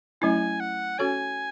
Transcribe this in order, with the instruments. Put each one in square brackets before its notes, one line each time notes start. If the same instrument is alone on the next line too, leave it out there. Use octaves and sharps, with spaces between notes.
[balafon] F#3 A3 C#4 E4 [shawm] G#5
[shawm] F#5
[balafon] C#4 F#4 A4 C#5 [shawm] G#5